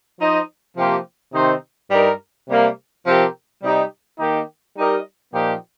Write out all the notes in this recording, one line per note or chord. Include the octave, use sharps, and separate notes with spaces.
F3 D#4 C5 D#5
C3 F3 A#3 G4 C5
C3 D#3 C4 D#4 C5
G2 G3 D#4 A#4
C3 G3 A#3
C3 F3 C4 G4 A#4
C3 G3 D#4 G4
D#3 A#3 D#4 G4
G3 D#4 G4 A#4 D#5
A#2 F3 A#3 D#4 G4